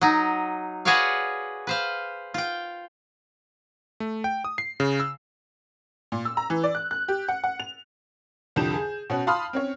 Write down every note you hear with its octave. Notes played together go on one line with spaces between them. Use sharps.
F#3 D#4
F#4 G#4 B4 C#5 D5 F5
B4 C5 F5
F4 G5
A3
G5
D#6
C7
C#3
E6
A#2
E6
A#5
E3
D5
F#6
F#6
G4
F#5
F#5
F7
C2 F2 D3 G4 G6 E7
G#4
B2 C#4 F#4
F5 A5 B5 C6 D#6 F6
C4 C#4 C#5